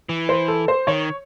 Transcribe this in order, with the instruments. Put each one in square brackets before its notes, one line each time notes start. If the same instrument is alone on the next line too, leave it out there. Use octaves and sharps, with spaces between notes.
[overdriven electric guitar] E3
[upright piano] C5
A4
C5
[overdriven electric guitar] D#3 [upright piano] C#5